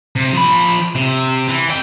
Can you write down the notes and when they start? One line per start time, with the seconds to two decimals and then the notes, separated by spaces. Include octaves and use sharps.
0.16 C3
0.33 F3 B5
0.95 C3
1.48 E3
1.69 F2 G5